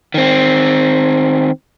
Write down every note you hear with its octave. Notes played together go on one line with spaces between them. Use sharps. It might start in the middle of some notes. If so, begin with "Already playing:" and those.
D#3 C4